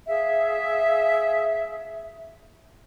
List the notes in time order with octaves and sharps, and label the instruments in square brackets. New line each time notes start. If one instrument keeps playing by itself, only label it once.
[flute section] G#4 E5 F5